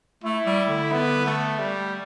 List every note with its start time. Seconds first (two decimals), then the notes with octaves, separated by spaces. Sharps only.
0.23 A3 E4
0.46 G3
0.68 D3
0.92 B3
1.26 A3
1.59 G3